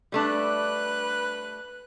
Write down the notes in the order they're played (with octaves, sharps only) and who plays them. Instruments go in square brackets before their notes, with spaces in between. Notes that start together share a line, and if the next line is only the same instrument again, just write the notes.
[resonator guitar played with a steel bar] G3 A3 D4 [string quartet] B4 F#6